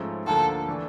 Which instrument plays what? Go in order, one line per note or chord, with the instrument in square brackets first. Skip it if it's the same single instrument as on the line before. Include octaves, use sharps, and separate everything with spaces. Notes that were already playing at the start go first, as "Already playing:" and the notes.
Already playing: [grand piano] G#2 F3 A3 C#4
[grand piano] D2 D3 F3 A#3 [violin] A4
[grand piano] E3 A3 D4